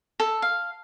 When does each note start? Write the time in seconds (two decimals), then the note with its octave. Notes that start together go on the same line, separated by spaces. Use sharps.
0.20 A4
0.42 F5